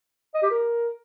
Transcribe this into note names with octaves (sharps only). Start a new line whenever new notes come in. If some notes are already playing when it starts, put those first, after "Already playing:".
D#5
G4
A#4